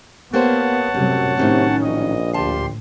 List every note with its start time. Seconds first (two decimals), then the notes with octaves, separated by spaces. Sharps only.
0.33 A#3 B3 G4 C5 C#5 F#5 A5
0.95 F#2 A2 C3 F#3 G3
1.37 A2 C3 D#3 F#3 C#4
1.82 A#1 D#5
2.34 D2 A2 F4 G4 A5 C6